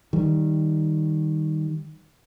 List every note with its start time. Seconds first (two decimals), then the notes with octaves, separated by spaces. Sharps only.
0.13 D#3 G3